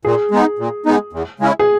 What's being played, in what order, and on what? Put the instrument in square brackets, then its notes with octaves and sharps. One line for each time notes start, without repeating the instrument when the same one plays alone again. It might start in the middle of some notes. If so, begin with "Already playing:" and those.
[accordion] A#2 [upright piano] G#4
[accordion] G#3 B3 D#4
A#2
G#3 B3 D#4
E2
C#3 G#3 C#4 E4
[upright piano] G#4